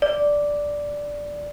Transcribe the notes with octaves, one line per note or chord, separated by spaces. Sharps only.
D5